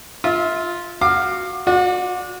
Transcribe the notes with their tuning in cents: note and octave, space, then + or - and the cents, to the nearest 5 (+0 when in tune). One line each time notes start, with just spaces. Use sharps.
F4 +0 E5 -30
F#4 -5 F5 +0 D6 +30
F#4 -35 D5 +0